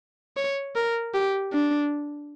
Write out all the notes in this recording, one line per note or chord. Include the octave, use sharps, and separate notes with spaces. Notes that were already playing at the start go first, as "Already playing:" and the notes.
C#5
A#4
G4
D4